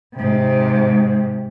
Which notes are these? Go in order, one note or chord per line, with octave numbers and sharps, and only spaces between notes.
G#2 C3